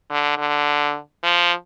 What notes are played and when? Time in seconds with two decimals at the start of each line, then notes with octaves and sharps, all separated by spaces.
0.10 D3
0.37 D3
1.23 F3